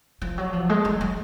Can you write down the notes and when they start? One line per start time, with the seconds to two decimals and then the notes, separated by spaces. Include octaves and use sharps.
0.22 F3
0.38 F#3
0.53 F3
0.69 G#3
0.85 G#3
1.01 F#3